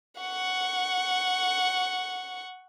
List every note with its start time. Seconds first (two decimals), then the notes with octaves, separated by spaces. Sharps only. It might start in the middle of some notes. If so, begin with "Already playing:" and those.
0.21 F#5 C#6